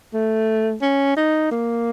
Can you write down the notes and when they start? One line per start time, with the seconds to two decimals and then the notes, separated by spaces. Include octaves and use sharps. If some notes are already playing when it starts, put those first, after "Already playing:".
0.14 A3
0.82 C#4
1.17 D#4
1.51 A#3